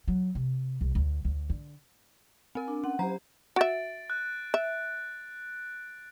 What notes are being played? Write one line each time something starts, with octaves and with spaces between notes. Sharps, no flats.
F#3
C3
C2
D2
D2
D3
C4 A#4 G#5
D4
C#4 F#5
F#3 G4 C5 A#5
F#4 E5 A6 D7
F#6
E5